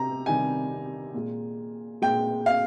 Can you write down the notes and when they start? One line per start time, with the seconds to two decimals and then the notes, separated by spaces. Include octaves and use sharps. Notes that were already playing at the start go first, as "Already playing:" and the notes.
Already playing: C3 A#5
0.26 C3 D#3 G3 G#5
1.14 A#2 G#3
2.02 A#2 G#3 G5
2.46 F5